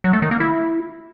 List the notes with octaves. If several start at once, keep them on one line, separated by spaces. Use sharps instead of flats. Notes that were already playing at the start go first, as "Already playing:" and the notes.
F#3
A3
D#3
A#3
E4